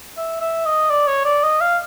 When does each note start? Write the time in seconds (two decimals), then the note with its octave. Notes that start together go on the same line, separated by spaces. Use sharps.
0.17 E5
0.41 E5
0.65 D#5
0.90 D5
1.07 C#5
1.25 D5
1.43 D#5
1.61 F5